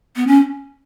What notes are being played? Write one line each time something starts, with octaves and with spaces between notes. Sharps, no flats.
B3
C#4